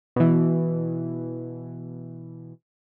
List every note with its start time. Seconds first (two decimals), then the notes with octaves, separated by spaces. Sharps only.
0.16 B2 E3